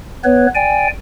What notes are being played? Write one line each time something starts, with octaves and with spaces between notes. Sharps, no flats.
B3 B4 C#5
D5 G5 G#5